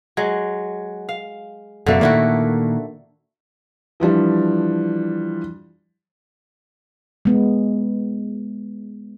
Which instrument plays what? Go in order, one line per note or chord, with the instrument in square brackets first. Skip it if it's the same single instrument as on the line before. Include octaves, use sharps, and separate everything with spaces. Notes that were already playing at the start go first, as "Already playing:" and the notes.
[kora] F#3 G#3
F5
[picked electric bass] F#1 F#2 B2 [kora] D3 A3 A#3
[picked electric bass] A#2 D#3 A#3 [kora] D3 E4 F#4
[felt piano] E3 F3 G3 D4
[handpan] G#3 B3